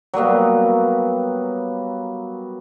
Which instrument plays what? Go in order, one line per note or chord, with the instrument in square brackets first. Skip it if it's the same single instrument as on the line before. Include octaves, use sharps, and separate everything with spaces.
[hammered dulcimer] F#3 G3 A#3 B3